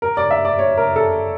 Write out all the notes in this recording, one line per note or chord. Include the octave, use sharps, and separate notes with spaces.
A#4
D5
E5
D5
C#5
A#4
A4